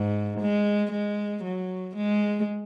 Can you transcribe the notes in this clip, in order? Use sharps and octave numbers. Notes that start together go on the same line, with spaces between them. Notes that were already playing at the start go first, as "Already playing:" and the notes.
Already playing: G#2
G#3
G#3
F#3
G#3